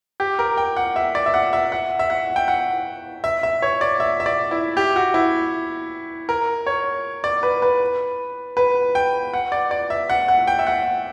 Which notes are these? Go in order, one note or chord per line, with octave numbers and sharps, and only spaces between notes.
G4
A#4
G5
F#5
E5
D5
E5
F#5
E5
F#5
E5
F#5
G5
F#5
E5
E5
C#5
D5
E5
E5
D5
E4
G4
F#4
E4
A#4
C#5
D5
B4
B4
B4
G5
F#5
D5
D5
E5
F#5
F#5
G5
E5
F#5